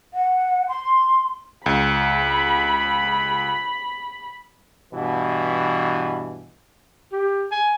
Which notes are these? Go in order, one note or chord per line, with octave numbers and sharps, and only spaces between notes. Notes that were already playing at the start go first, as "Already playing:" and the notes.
F#5
C6
C#2 B5
G2 B2 E3
G4
G#5